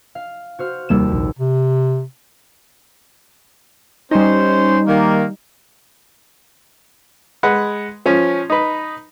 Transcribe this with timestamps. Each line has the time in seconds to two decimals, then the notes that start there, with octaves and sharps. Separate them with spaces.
0.15 F5
0.59 F#4 C5 F6
0.89 F1 D#2 G3 A#3 E6 E7
1.12 A#1
1.39 C3
4.11 G3 C#4 D#4 C5
4.87 D#3 A#3
7.43 G#3 B4 F#5
8.06 F3 C#4
8.50 D#4 B4